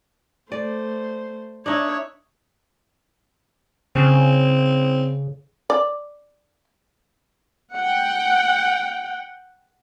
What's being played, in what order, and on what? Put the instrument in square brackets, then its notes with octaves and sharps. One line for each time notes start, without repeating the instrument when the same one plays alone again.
[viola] A3 C5 [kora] D5
[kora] D4 D#4 [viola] C#5 E5
[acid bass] C#3 [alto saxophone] C4
[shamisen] D5
[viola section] F#5 G5